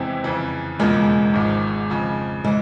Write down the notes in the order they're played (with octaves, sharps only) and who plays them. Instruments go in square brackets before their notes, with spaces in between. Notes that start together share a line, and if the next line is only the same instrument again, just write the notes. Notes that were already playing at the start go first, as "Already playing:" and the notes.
Already playing: [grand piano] E2 C3 E3 G#3 E4 [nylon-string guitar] C4
[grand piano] F2 C#3 E3
[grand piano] E1 E2 C#3 F3 A#3 [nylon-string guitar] G#3
[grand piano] G#1 G#2 F3
F2 C#3 F3
[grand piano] C#3 E3 [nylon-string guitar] G#3